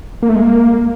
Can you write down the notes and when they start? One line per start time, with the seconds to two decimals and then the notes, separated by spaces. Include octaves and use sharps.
0.23 A#3
0.29 A3
0.35 G#3
0.42 A#3